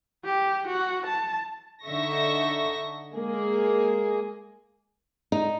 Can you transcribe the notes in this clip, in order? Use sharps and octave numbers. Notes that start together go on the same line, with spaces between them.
G4
F#4
A5
D3 D#4 E5 C#6 A#6
G#3 A#3 G#4
D#4